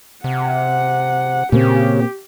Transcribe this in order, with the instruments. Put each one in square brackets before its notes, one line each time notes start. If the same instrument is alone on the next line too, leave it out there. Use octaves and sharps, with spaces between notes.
[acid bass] C3 [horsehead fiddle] F#5
[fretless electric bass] A#2 A#3 C4 [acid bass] C#3 [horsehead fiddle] G4